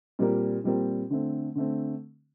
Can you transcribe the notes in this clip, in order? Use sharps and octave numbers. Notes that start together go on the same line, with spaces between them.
A#2 G3 C4 G4 A#4
A#2 G3 C4 G4 A#4
D3 A3 C4
D3 A3 C4